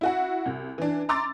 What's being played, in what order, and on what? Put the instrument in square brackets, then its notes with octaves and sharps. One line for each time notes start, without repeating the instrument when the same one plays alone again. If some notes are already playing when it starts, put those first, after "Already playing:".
[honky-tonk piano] E4 F#4 F#5
C2
E3 D4
A#5 C6 D6 E6 A6